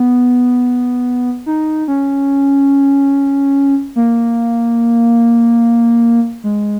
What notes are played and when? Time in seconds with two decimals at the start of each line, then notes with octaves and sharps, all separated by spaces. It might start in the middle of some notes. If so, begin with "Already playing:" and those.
Already playing: B3
1.46 D#4
1.88 C#4
3.96 A#3
6.44 G#3